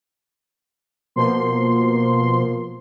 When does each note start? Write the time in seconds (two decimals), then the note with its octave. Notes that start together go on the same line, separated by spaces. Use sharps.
1.16 B2 F3 A#3 C6